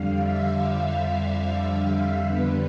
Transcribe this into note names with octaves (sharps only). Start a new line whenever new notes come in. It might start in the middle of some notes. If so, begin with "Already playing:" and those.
Already playing: F2 D3 G3 F5
E5
F5
F5
F5
E5
F2 D3 G3 B3 B4